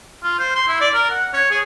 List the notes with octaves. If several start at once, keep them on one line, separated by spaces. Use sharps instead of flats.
F4
C5
C6
E4
D5
A#4
F#5
C#5
G#4